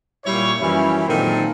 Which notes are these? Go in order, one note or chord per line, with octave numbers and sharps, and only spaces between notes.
A#2 G3 E4 C#5
F#2 E3 F3 G3 C#4 E4
A#2 D#3 F#3 C4 A4